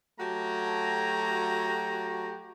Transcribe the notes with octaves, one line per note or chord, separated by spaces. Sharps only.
F#3 A3 F#4 G4 A5 A#5